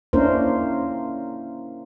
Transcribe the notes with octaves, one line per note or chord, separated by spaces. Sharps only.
A#3 C#4 D4 E4 A#4 C5